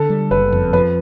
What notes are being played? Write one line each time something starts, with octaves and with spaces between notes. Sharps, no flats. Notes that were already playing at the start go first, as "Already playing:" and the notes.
Already playing: D3 A4
G3
F#1 B4
F2
F3 B4